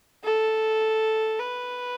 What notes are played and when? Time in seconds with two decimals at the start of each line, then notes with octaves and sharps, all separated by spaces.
0.24 A4
1.39 B4